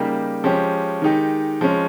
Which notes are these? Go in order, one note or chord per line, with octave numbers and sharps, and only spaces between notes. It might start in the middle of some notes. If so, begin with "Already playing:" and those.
Already playing: C#3 G3 A#3 D#4 G4
F3 G#3 C#4 G4
D#3 G#3 D#4 G4
F3 G#3 C#4